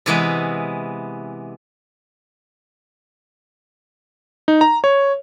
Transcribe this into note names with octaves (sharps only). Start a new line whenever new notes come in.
C3 E3 G#3 B3
D#4
A#5
C#5